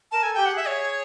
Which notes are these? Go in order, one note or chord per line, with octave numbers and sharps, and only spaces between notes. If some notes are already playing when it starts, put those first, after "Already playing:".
A#4 A5
A4 G#5
G5
G4
F#5
G#4 E5
C#5